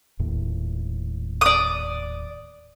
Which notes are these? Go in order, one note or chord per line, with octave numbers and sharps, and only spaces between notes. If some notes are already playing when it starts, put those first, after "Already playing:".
D#1 D#2 A2
D5 D#6